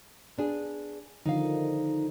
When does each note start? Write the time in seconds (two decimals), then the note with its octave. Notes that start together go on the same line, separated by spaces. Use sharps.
0.38 B3 D4 G#4
1.26 D3 D#3 F3 D#4 F5